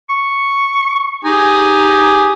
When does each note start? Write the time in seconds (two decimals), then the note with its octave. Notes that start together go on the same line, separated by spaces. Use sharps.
0.10 C#6
1.25 D#4 G4 G#5 D#6